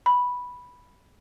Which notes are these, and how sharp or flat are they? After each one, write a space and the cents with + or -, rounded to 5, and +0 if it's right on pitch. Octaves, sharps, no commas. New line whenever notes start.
B5 -5